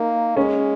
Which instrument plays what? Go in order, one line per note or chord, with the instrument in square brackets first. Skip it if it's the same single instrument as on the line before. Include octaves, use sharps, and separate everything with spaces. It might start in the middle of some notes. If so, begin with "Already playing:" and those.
Already playing: [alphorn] A#3 [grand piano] D#4
[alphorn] G#3 [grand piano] C#4